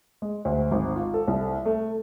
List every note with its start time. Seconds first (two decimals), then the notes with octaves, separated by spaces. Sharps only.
0.22 G#3
0.45 D2
0.71 G#1
0.96 F4
1.14 A4
1.27 C2
1.65 A3